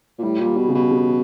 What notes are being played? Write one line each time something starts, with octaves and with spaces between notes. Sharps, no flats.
A#2
A2 G3
A#2
G3
B2
C#3
B2
C#3